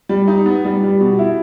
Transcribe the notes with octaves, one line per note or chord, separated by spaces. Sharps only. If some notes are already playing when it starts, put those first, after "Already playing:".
G3
D#4
B3
G3
G3
B2
E4